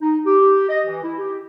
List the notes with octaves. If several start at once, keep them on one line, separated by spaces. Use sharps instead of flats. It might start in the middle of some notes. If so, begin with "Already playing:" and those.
D#4
G4
D#5
E3
E4
G4